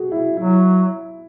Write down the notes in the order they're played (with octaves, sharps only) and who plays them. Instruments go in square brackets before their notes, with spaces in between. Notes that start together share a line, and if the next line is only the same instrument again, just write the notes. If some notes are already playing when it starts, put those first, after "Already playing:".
Already playing: [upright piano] F#4 G#4
E4
[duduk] F#3 [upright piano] E4